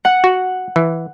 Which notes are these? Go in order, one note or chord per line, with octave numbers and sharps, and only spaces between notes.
F#5
F#4
E3